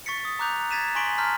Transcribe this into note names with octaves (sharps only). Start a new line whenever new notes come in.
C#6 A6 B6 C#7
D#6
A#5 D6 F#6 G6 F7
G#6 A6 B6 D#7 E7
G#5 C6 C#6 B6 D7 F#7
A5 A#5 C6 F6 G6 B6